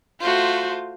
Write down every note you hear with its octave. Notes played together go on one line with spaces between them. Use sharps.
A3 F4 F#4 C5